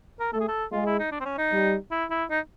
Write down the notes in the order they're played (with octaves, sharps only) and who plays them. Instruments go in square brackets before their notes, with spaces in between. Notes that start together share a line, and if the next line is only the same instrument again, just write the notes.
[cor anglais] A#4
[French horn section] A3 [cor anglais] A4
[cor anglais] G#4
A4
[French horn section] G#3 [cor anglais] F4
[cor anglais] E4
D#4
D4
C4
C#4
D#4
[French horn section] G3
[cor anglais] E4
E4
D#4